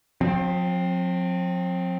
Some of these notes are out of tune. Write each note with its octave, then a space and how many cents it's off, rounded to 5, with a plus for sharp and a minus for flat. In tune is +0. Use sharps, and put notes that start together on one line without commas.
F3 +45 C4 +5